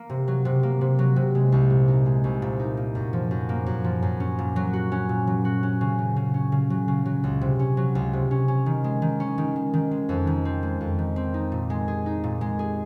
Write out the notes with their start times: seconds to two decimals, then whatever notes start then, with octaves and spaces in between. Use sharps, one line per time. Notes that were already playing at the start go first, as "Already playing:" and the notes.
Already playing: A#3
0.10 C3
0.28 F#3
0.45 C3
0.63 A#3
0.81 C3
0.99 F#3
1.16 C3
1.35 G#3
1.52 C2
1.70 A#2
1.88 D#4
2.06 G#3
2.24 C2
2.42 A#2
2.59 D#4
2.77 A#3
2.95 F#2
3.13 F3
3.31 F#2
3.49 A#3
3.66 F#2
3.84 F3
4.02 F#2
4.20 C#4
4.39 A#2
4.56 F#3
4.73 F#4
4.92 C#4
5.09 A#2
5.27 F#3
5.45 F#4
5.63 C#4
5.81 C#3
5.99 F#3
6.16 C#3
6.34 C#4
6.52 C#3
6.70 F#3
6.88 C#3
7.06 F#3
7.24 C#2
7.41 C3
7.59 C#4
7.77 F#3
7.95 C#2
8.13 C3
8.31 C#4
8.48 C#4
8.66 D#3
8.84 G#3
9.02 D#3
9.20 C#4
9.38 D#3
9.56 G#3
9.74 D#3
9.91 G#3
10.09 F2
10.27 D#3
10.45 C4
10.63 G#3
10.81 F2
10.99 D#3
11.16 C4
11.34 D#4
11.52 A#2
11.70 G#3
11.88 G#4
12.06 D#4
12.24 A#2
12.41 G#3
12.59 G#4